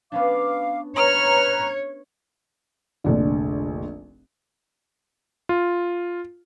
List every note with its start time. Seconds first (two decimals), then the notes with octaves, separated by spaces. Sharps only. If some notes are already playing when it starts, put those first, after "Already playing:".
0.12 B3 C#4 D4 F5 D6
0.96 B4 C#5 A#5 F6
3.04 F1 A#1 D3
5.49 F4